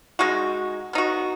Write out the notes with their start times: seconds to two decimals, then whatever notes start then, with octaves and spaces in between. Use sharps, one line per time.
0.19 G#3 D#4 F#4
0.93 B3 D#4 F#4